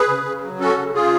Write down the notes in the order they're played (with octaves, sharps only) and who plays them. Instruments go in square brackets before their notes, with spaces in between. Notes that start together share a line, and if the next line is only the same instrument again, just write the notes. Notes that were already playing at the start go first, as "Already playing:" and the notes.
Already playing: [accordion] G#4 B4
C#3
C#3
F#3
C#4 F#4 A4
C#3
C#3 F4 G#4